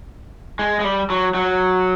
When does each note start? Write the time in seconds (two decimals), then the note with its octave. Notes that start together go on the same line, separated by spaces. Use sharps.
0.59 G#3
0.80 G#3
0.84 G3
1.10 F#3
1.34 F#3